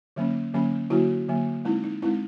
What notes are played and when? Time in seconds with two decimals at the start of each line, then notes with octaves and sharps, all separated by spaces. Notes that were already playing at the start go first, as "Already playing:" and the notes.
0.16 D3 F#3 A#3 C#4
0.54 D3 F#3 A#3 C#4
0.90 D3 F#3 A#3 E4 F#4
1.28 D3 F#3 A#3
1.65 G#3 C4 D#4 E4
1.84 D#4
2.02 G#3 C4 D#4 E4